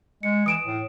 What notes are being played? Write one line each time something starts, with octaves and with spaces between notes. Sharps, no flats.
G#3 C#7
E3 D#6 D7 E7
A2